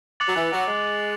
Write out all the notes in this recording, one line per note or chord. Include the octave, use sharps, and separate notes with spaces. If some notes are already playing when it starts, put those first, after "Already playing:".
D6 F#6 A6 C#7 F#7
F#3
E3
F#3
G#3